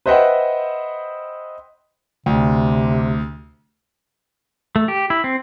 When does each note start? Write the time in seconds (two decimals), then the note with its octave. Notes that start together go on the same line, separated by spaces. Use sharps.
0.06 B4 C5 D#5 E5 F#5 G5
2.26 D2 C3
4.76 A3
4.88 G4
5.10 E4
5.24 C4